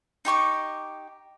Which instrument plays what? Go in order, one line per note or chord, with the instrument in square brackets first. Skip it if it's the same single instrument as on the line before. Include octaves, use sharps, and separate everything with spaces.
[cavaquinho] D#4 G4 C#6 D6